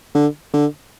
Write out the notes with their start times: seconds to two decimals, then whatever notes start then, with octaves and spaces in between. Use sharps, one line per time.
0.15 D3
0.54 D3